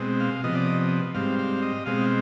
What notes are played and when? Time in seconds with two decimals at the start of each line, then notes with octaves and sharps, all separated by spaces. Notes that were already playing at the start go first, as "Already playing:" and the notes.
Already playing: B2 G#3 C4
0.20 F5
0.44 C3 F3 B3 D#5
0.55 D5
0.66 D#5
1.14 G#2 G3 C4 F5
1.39 F5
1.62 D#5
1.86 B2 G#3 C4 F5